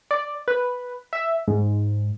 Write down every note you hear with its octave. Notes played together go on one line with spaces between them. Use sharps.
D5
B4
E5
G#2